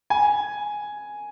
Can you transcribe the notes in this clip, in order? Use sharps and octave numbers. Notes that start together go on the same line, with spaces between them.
G#5